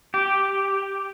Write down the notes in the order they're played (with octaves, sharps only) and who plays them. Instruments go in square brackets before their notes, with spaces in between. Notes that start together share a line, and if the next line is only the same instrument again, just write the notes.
[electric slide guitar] G4